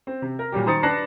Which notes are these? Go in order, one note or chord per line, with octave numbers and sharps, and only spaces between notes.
C4
C3
A#4
A#2 F#3 G3 G4
D#3 C5 A#5 D#6 A6 C#7
D4 B4 A5 F#6 A#6 C7